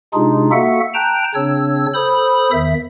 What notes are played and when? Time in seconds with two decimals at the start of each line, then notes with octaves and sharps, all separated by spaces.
0.14 C3 G#3 D4 D#4 F4 G#4
0.52 A#3 F#4 A4 E5 F#5
0.94 G5 A5 A#5 F#6 G6
1.35 C#3 C4 D4 C#5 E6
1.94 A4 C5 B5 D#6
2.52 E2 D#3 E5